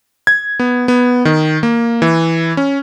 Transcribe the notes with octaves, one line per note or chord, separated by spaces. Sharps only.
G#6
B3
B3
D#3
A#3
E3
C#4